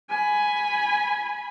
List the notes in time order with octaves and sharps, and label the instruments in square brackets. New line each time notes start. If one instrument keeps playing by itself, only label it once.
[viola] G#5 B5